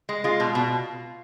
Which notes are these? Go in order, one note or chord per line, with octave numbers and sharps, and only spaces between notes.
G#3
G#3 F4
B2
B2